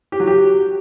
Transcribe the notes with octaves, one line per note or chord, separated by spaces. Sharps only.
G4
F#3
G4